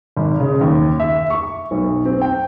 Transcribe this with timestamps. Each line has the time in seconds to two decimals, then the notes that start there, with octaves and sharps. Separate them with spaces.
0.17 G#1
0.40 C#3
0.61 D#2
1.00 E5
1.30 C#6
1.71 B1
2.05 C4
2.21 G5